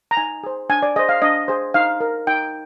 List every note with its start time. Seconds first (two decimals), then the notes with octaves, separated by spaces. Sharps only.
0.11 A#5
0.17 D#4 G#5
0.43 G#4 C5
0.70 D4 G#5
0.82 D5
0.96 G#4 C5 D#5
1.09 F5
1.22 D4 D#5
1.48 G#4 C5
1.74 D#4 F5
2.01 A#4
2.27 D#4 G5